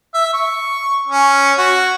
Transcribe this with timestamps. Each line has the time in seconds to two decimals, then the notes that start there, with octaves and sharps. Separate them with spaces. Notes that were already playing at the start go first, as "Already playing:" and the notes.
0.15 E5
0.34 C#6
1.08 C#4
1.58 F#4